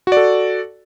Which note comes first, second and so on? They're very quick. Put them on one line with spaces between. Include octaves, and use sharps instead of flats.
F#4 D5 A4